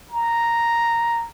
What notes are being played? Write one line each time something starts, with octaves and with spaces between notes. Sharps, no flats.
A#5